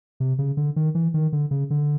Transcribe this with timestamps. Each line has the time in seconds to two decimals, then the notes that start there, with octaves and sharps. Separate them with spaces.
0.20 C3
0.38 C#3
0.57 D3
0.76 D#3
0.95 E3
1.14 D#3
1.32 D3
1.51 C#3
1.70 D3